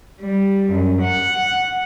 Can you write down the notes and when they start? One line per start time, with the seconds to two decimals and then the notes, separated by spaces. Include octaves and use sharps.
0.21 G3
0.70 F#2
1.03 F#5